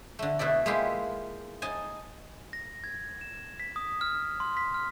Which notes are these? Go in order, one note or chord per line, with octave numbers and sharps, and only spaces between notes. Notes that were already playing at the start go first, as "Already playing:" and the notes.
D3 A3
B2 A3 E4 D5
G#3 A#3 E4 F4 G4
D#4 G#5 A5
A#6
G#6
E7
B6
D#6
F6
C6
B6
F6